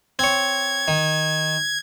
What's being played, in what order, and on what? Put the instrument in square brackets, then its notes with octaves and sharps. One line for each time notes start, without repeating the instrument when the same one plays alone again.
[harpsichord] C4 C#5 [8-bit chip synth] G#6
[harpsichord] D#3